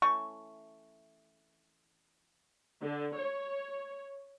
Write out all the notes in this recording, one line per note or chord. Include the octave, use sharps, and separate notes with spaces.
E3 A3 C#4 C#6
D3
C#5